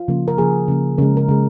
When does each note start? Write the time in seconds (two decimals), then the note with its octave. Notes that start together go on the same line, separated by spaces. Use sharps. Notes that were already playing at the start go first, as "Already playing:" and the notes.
Already playing: F4
0.08 C#3 F3 A#3
0.28 A#4
0.37 C#3 F3 A#3 G#4
0.68 C#3 F3 A#3
0.98 C#3 G#3 A#4
1.17 A#4
1.29 C#3 G#3